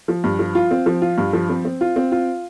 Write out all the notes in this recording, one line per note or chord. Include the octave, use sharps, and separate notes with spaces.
F3
G2
F3
F4
C4
F3
F4
G2
F3
C4
C4
F4
C4
F4